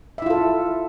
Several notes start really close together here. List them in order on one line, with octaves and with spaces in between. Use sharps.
E5 E4 F4 A4